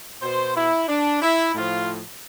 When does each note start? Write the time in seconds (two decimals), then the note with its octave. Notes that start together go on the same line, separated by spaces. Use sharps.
0.22 B2 C5
0.56 E4
0.89 D4
1.22 E4
1.55 A2 F3 F4